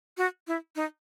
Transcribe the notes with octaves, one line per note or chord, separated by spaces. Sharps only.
F#4
E4
D#4